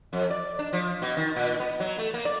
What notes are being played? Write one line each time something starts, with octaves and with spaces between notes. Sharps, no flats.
F2
D5
D4
F3
B2
D#3
A#2
B3
F#3
A3
A#3
D5